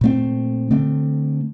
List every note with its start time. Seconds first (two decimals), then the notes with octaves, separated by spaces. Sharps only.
0.01 A#2 A3 C4
0.71 D3 A3 C4